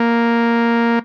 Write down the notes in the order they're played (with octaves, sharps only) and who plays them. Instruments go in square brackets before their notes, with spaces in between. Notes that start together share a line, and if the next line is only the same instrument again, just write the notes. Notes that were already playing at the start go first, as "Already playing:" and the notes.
Already playing: [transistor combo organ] A#3